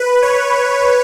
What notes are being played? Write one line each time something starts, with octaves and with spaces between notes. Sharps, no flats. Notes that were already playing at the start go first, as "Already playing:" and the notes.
Already playing: B4
C#5